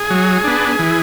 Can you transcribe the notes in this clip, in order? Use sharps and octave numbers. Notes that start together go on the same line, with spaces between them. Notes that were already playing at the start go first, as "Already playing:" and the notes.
Already playing: G#4
F#3
B3 D4
E3